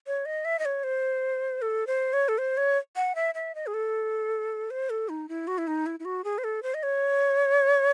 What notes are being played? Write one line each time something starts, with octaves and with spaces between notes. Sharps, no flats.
C#5
D#5
E5
D#5
C#5
C5
A4
C5
C#5
A4
C5
C#5
F#5
E5
E5
D#5
G#4
A4
C5
A4
D#4
E4
F#4
E4
D#4
E4
E4
F#4
G#4
C5
A4
C5
D#5
C#5